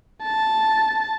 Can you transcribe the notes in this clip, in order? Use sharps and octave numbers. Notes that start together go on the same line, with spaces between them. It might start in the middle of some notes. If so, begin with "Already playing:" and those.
A5